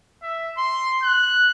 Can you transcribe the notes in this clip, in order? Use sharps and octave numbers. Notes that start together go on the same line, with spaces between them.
E5
C6
F#6